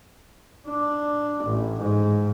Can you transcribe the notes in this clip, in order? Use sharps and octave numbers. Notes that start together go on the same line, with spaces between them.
D4
A1
G#2